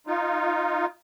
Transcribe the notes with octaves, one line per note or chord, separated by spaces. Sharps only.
D#4 F4